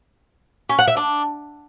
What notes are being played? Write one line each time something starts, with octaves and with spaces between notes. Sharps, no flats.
C#4
F#5
E5
D4